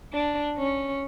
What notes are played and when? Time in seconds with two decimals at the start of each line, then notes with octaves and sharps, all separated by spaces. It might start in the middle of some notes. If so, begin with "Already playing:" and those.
0.13 D4
0.57 C#4